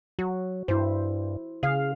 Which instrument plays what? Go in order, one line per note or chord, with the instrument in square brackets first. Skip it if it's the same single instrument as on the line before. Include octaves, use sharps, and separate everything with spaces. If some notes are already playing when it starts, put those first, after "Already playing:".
[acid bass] F#3 [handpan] F#4
[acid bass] G2 [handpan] E4 C5
[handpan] C#3 F5 [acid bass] G#4